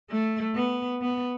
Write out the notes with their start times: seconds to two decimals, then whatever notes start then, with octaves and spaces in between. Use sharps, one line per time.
0.10 A3
0.55 B3
1.01 B3